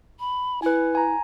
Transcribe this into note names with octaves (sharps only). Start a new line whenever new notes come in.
B5
E4 B4 G#5
G#5 A#5